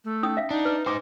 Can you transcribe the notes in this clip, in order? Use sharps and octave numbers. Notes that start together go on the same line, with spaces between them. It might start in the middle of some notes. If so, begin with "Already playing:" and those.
A3
C#4 D#4 D#6
E5 F5
D4 D#4
B4
D#4 C5 G#5 D6